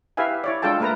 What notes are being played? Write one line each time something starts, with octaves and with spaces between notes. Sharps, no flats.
E4 G4 B4 E5 F5 G#5
E4 C#5 D5
G#3 D4 F4 A4 G5 A5
A3 A#3 A#4 B4 A#5